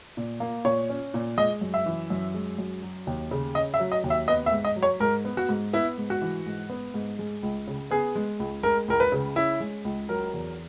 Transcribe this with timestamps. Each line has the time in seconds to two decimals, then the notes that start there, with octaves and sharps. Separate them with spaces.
0.17 A#2
0.40 A#3
0.65 A#2 C#5
0.90 C#4
1.14 A#2
1.38 G#3 D#5
1.61 F#2
1.74 E5
1.86 E3
2.10 F#2
2.34 G#3
2.59 F#2
2.82 F#3
3.07 D#2
3.31 C#3
3.55 C#4 D#5
3.74 E5
3.80 F#3
3.92 D#5
4.04 D#2
4.10 E5
4.28 B3 D#5
4.46 E5
4.52 G#2
4.65 D#5
4.76 F#3
4.83 C#5
5.00 G#2 A#4
5.25 B3
5.37 F#4
5.49 G#2
5.73 B3 E4
5.98 G#2
6.10 F#4
6.22 E3
6.46 G#2
6.70 B3
6.94 G#2
7.19 G#3
7.43 C#2
7.67 C#3
7.91 B3 G#4
8.15 G#3
8.40 C#2
8.63 G#3 A#4
8.88 C#2 A#4
9.00 B4
9.12 C#3
9.36 C#4 E4
9.60 G#3
9.85 C#2
10.09 F#3 A#4
10.34 E2